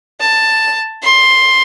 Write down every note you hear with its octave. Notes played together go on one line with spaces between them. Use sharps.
A5
C6